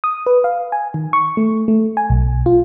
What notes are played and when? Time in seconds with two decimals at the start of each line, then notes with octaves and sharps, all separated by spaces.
0.04 D#6
0.26 B4
0.44 F5
0.72 G#5
0.94 D#3
1.13 C#6
1.37 A3
1.68 A3
1.97 G#5
2.10 B1
2.46 F4